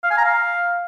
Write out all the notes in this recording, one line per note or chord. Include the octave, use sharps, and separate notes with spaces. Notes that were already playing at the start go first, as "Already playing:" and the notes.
F5
G#5
A#5
F5